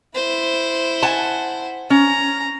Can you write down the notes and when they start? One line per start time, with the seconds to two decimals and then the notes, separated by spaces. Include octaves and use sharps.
0.15 E4 C5
1.03 F#5 G#5 A5
1.90 C#4 A#5